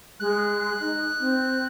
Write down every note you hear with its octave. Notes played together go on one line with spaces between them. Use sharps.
G#3 F#6
D#4
C4